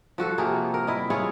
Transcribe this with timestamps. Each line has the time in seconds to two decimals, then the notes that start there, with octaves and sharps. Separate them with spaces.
0.18 F3 F#4 A4
0.38 C3 A#3 G#4
0.74 A#4
0.87 E4 D#5
1.10 E4 F4 G#4 C#5